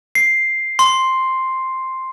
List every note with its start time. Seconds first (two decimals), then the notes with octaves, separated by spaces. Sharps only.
0.15 C7
0.79 C6